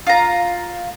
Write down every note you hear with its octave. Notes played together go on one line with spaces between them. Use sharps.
F4 A#5